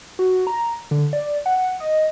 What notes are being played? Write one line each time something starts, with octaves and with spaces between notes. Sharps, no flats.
F#4
A#5
D3
D5
F#5
D#5